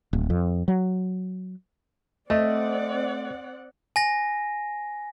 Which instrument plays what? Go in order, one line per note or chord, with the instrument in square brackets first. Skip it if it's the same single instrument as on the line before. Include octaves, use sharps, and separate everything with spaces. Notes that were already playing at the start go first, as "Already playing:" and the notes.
[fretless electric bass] D1
F2
F#3
[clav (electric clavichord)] A3 [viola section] C4 D5 F#5 [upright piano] D#5
[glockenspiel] G#5 A#6